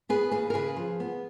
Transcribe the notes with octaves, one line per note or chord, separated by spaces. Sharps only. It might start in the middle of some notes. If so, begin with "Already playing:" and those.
B3 G#4 B4
D#2 G#4 B4
A#4
C#3 G#4 B4
F3
B3